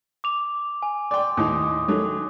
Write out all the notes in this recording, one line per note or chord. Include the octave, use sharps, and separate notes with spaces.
D6 F7
G#5
D5 G5 C6 D6
D#2 A2 D#4 D#6
D#3 F#3 A3